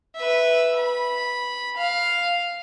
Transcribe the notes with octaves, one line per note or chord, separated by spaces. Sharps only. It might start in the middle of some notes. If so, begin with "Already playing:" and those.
B4 E5
B5
F5